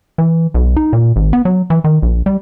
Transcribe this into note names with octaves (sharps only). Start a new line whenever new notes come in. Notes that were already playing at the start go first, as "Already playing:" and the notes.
E3
B1
D#4
A#2
G#1
B3
F#3
E3
D#3
A#1
G3